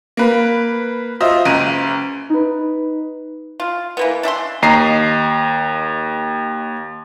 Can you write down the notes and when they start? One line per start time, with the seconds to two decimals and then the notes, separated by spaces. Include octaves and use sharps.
0.17 A#3 B4
1.20 F4 C5 D#5 E5
1.45 F#1 C#2 A#5 D#7
2.30 D#4 B4
3.60 F4
3.97 E3 A#3 B3
4.23 D4 E5 G5 C6
4.62 D#2 D#5 A#5 C7